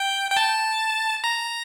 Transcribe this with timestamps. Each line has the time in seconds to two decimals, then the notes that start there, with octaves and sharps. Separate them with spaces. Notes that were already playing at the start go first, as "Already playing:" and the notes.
Already playing: G5
0.31 G5
0.37 A5
1.24 A#5